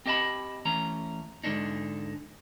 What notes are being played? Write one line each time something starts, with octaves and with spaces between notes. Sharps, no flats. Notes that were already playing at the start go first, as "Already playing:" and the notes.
C4 G4 D#5 A5 B5
E3 A3 C#4 A#5
G#2 D3 G#3 A3 D4 D#4